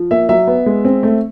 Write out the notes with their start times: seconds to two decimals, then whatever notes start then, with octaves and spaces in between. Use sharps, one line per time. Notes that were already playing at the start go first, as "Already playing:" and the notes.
Already playing: F3
0.11 A#3 E5
0.29 F#3 E5
0.47 B3
0.66 G#3
0.85 C4
1.03 A3